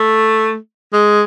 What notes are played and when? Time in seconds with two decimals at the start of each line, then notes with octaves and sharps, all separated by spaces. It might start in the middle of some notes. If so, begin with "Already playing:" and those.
Already playing: A3
0.93 G#3